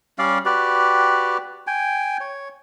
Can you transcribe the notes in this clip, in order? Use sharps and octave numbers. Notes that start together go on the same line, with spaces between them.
G3 C#4 D5 F5
F#4 G4 B4 D5
G5 G#5
C#5